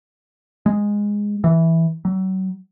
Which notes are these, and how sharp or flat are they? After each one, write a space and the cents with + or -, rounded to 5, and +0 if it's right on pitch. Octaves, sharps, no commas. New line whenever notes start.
G#3 -10
E3 -5
F#3 +35